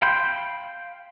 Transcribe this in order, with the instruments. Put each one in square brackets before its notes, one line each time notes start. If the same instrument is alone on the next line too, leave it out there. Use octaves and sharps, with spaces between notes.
[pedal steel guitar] F5 G5 B5 C6 G6